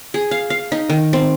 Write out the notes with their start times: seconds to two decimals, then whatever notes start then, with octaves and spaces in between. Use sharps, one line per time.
0.14 G#4
0.31 F5
0.50 F5
0.72 D#4
0.89 D#3
1.13 C4